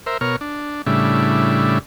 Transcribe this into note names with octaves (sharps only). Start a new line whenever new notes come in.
A#4 C5 E5
B2 A#4 C#5 F6
D4
A2 C#3 G3 D4 E4